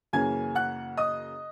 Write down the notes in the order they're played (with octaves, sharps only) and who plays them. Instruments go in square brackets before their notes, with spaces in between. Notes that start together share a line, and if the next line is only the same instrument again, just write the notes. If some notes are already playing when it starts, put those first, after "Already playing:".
[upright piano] F#2 C#3 E3 A#3 C#4 G#5 G#6
F#5 F#6
D#5 D#6